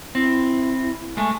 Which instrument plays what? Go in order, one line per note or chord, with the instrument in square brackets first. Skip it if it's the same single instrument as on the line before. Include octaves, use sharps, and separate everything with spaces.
[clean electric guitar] C4 [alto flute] E4
[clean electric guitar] G#3 A3 [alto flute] G#5